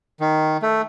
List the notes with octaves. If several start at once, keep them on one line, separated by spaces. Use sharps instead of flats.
D#3
A3